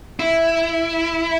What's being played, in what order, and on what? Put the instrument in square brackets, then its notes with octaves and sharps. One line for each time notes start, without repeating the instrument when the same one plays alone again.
[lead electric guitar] E4